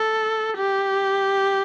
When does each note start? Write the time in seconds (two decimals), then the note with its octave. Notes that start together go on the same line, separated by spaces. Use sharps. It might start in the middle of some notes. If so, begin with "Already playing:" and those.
Already playing: A4
0.57 G4